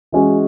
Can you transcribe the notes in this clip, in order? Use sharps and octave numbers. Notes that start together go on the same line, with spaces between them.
E3 G#3 C#4 F#4